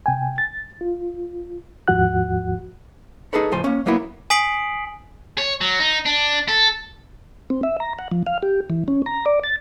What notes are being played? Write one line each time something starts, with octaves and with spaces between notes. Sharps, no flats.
C3 G5 G#5
A6
F4
D#2 G#2 F3 F#4 F#5 F#6
D#4 G#4 A4 B4 C#5
C#2 A2 F3 C5 G#5 C6
A#3 C#4
F#3 A#3 B3 E4
G#5 D#6 B6 C7 D7 F#7
C#5
F#3
D#4
D4
A4
C4
E5
A#5
F#5
F3
F5
G4
E3
C#4
A#5
D5
A6